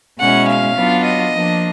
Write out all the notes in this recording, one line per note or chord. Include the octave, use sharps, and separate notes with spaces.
B2 G#3 C#4 E4 F#5
F5
F#3 B3 D4 F4
D#5
F3 A#3 D4